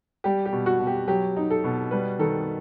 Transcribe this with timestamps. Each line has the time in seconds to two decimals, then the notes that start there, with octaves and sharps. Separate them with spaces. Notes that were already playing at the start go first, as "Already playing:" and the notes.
0.24 G3 G4
0.45 G4
0.53 B2
0.66 F#4
0.80 B2
0.87 G4
1.08 F#3 G4
1.37 D#4
1.50 A4
1.64 B2
1.91 G3 B4
2.19 D#3 A4